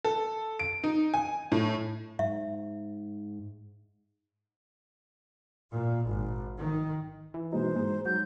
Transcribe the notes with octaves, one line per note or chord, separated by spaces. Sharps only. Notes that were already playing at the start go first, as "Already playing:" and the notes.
A4
D7
D#4
G#5
A2
G#2 E5
A#2
G#1
D#3
E3
B2 G#3 D#4 C5
G#2 G#3
F#3 G6